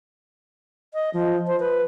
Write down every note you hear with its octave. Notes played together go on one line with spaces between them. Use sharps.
D#5
F3
C5
B4